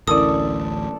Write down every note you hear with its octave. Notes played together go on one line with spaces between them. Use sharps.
A1 D2 C#4 E4 A4 A#4 D5 D#6